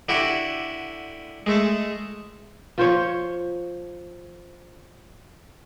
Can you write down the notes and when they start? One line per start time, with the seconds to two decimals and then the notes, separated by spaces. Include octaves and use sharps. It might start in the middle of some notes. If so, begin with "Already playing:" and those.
0.09 D3 E4 F#4 G4
1.46 G#3 A3 A4
2.78 F3 C5 C#5